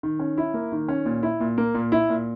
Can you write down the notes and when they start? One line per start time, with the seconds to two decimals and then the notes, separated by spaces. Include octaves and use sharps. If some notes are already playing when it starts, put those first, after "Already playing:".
0.03 D#3
0.19 C#4
0.38 E4
0.54 A#3
0.72 D#3
0.88 C#4
1.06 A#2
1.23 E4
1.40 A#2
1.58 A#3
1.75 A#2
1.92 E4
2.10 A#2